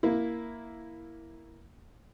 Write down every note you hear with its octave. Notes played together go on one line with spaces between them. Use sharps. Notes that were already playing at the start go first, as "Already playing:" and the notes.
A#3 E4